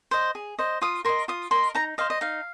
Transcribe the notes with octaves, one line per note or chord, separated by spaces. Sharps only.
C5 D#5
G#4
C5 D#5
F4 D#6
A#4 D#5 C6
F4 D#6
A#4 D#5 C6
D#4 A#5
C5 D#5 F5
D#5
D#4 F5